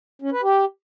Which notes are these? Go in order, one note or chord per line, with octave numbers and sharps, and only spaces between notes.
C#4
B4
G4